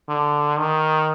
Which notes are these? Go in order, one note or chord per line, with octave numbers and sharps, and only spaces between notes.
D3
D#3